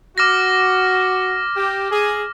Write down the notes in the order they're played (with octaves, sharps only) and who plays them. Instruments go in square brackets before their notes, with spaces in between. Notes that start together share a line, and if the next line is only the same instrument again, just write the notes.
[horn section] F#4 [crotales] D6 F6 A#6
[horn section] G4
G#4